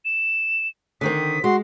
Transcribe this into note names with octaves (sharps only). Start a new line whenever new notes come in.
E7
D3 D#3 C4 D#6 B6
G#3 F#4 C6